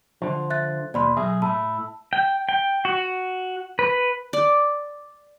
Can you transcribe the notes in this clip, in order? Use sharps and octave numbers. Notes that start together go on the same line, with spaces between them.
D3 F3
E5 F#6 A6
D#2 B2 D5 B5 C6
B1 G#4 E5
A2 E4 A5
G5
G5
F#4
B4
D5